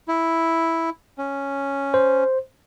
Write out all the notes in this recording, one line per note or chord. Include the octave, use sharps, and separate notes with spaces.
E4
C#4
C5